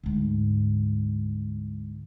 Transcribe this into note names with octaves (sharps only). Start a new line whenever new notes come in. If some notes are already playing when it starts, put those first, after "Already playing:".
D2 G#2